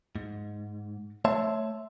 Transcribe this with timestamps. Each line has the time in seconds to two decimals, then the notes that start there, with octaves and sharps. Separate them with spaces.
0.16 G#2
1.25 A3 C#5 E5 A5 C6